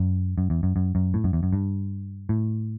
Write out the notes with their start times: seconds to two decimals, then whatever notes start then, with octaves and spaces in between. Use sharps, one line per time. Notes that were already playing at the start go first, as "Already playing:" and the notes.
Already playing: F#2
0.38 F#2
0.50 E2
0.63 F#2
0.76 F#2
0.95 F#2
1.14 A2
1.24 F#2
1.33 E2
1.43 F#2
1.53 G2
2.29 A2